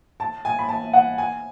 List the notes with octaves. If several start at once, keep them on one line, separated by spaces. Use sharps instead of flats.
A5
G#5
B5
A5
F#5
G#5